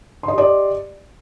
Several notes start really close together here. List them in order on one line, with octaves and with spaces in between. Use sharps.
C6 D#5 G4 D5